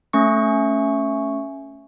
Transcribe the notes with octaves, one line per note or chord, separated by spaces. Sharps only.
A3 C#4 C#6